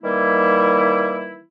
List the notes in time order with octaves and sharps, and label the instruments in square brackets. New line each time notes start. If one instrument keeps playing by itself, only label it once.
[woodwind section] D#3 E3 G3 A#3 E4